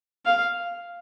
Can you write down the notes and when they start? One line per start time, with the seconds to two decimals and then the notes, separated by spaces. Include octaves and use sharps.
0.26 F5